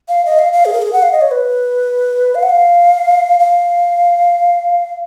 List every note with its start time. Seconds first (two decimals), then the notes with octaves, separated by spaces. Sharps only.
0.09 F5
0.26 D#5
0.39 F5
0.53 F5
0.65 G#4
0.73 A#4
0.82 G#4
0.93 F#5
1.02 F5
1.12 D#5
1.21 C#5
1.31 B4
2.35 F5
2.43 F#5
2.49 F5
3.40 F5